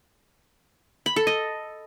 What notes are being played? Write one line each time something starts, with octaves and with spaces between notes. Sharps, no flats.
B5
A4
D#5